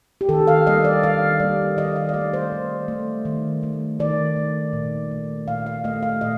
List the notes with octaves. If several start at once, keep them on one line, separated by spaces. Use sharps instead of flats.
G4
D#3 A4
F5
G3 A#3 D#5
D5
D#3 F5
G3 A#3 D5
D#3 D#5
F5
D5
A3 D#5
C5
D#3
A3
D#3
A3
D#3 D5
A3
A#2
A3
A#2 F5
F5
A3 D#5
F5
A#2 D#5